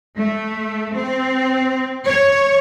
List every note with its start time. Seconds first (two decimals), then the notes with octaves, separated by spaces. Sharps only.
0.17 A3
0.95 C4
2.07 C#5